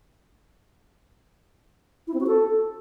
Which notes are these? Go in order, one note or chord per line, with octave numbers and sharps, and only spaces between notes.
E4
C4
F#4
A4